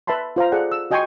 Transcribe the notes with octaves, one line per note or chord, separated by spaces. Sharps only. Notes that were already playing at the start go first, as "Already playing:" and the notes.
B4 E5 A5 B5 C6
F4 C5 F5 A#5
G#4 A4 D5 F#5
E6
F#4 D#5 G5 G#5 C6 C#6